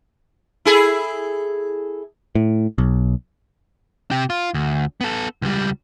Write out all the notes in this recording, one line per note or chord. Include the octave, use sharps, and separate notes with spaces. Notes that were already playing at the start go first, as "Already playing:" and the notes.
E4 G#4 A4
A2
B1
C3 G4
F4
D2
B3 A4
C#2 G3